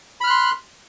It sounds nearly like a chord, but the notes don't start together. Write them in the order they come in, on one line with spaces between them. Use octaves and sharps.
B5 F6 F#6 C6